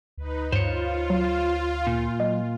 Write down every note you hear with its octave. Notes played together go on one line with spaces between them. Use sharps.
D2 D#4 B4
G2 F4 C5 C#5
F#3
A#2
F#3 D#5